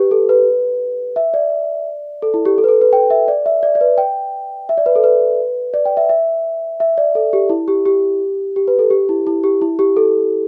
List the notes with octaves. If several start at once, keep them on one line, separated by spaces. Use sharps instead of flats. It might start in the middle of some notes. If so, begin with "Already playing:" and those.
Already playing: G4 B4
A4
B4
E5
D5
A4
E4
G4
A4
B4
A4
B4
G5
E5
D5
E5
D5
D5
B4
G5
E5
D5
B4
A4
B4
D5
G5
E5
E5
E5
D5
A4
G4
E4
G4
G4
G4
B4
A4
G4
E4
E4
G4
E4
G4
A4